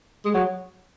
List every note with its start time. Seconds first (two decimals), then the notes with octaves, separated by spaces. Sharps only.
0.25 G#3
0.34 F#3